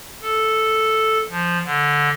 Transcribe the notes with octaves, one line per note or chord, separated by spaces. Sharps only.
A4
F3
D3